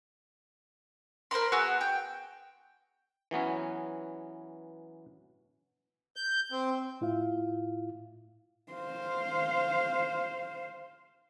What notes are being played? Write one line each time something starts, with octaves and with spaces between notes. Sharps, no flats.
A#4 C5 B5 C6
B3 F#4 G#4 E6
G5
E3 F#3 B3 C#4
G6
C4
A2 E4 F4 F5
C5 F5